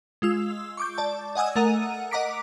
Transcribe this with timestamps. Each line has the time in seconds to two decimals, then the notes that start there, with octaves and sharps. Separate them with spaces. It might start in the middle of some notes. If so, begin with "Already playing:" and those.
0.22 G#3 F4 E6
0.77 C#6 D6 G6
0.98 D5 A5
1.35 D#5 F#5 G#5 D#6 E6
1.56 A3 A#4 F#5 A#5 D#7
2.11 D#5 F#5 A#5 D6 B6 D7